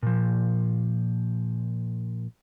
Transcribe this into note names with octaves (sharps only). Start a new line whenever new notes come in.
A#2 F3